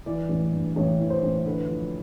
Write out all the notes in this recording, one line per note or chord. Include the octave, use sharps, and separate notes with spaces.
E3 D5
A1
G2
A1 C#5
E3
C5
A1
D3 B4
F3